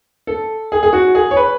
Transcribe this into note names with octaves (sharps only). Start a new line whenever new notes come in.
A4
G#4
G#4
F#4
G#4
C#5
B4